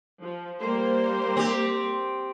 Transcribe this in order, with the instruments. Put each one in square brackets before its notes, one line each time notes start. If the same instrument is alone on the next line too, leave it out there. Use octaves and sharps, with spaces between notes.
[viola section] F3
G3 A#3 C5
[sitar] C4 G4